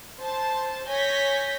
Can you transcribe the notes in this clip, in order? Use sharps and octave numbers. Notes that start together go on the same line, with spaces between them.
C5 A5
C#5 G#5 G6 A#6 B6